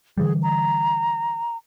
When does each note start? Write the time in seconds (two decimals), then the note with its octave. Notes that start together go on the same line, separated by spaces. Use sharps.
0.18 D3 E3 G3 G#4
0.43 A#5